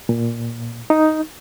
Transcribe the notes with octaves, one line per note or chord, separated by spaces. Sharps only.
A#2
D#4